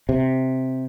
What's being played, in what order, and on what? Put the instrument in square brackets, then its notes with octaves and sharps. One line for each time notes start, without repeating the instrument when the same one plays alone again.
[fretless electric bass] C3